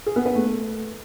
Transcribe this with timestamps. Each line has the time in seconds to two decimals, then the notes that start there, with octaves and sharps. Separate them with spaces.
0.06 G#4
0.16 B3
0.26 B4
0.35 A3